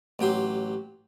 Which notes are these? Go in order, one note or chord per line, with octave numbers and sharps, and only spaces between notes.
A1 F#3 G4 C6